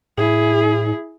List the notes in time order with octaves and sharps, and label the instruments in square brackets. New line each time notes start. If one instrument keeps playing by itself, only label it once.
[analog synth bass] A2 [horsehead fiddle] E4 G#4